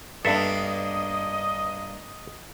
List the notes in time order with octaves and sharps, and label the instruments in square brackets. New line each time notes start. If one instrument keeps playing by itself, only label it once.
[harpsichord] G2 [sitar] A#3 B3 D4 [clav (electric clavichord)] A4 E5 [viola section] D#5